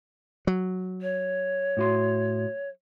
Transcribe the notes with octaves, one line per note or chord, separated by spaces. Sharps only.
F#3
C#5
A2 F#4 C6